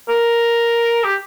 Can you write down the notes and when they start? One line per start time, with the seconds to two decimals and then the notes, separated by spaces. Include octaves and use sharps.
0.09 A#4
1.04 G4